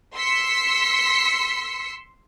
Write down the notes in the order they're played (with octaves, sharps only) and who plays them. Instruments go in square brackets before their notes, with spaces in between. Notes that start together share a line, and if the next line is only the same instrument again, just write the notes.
[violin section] C6 E6 B6 C#7